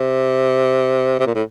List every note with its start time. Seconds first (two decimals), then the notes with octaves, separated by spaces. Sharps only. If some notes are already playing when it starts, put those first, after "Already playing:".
Already playing: C3
1.20 C3
1.26 A#2
1.35 A2